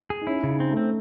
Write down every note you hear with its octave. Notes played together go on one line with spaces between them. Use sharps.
G#4
D#4
C#4 E4
C#3
D#4
C4
A3
C4